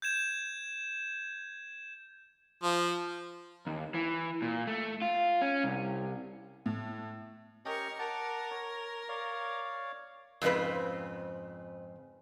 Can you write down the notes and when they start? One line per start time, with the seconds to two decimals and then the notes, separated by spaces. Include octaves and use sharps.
0.02 G6 G#6 E7
2.63 F3
3.67 D#2
3.95 E3
4.42 A#2
4.67 A3
5.02 F4
5.42 C#4
5.64 C2
6.66 A2
7.65 C#4 G4 A#4 D#5 C#6
7.99 A#4 F#5 A5 D6
8.51 C#5
9.09 C#5 D5 F5
10.42 F2 G#2 C#3 C4 B4